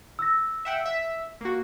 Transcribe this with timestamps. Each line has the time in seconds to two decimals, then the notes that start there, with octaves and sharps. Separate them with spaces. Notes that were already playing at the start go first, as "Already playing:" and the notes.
0.19 E6 A#6
0.65 E5 F#5 G5
0.86 E5
1.41 A#3 F#4